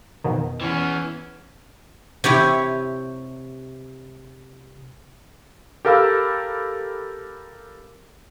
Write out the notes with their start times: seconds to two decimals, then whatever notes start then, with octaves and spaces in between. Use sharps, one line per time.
0.24 F2 B2 D#3
0.61 E3 B3 C#4
2.24 C3 E4 G4 C#5
5.85 G4 A4 A#4 F5 B5 E6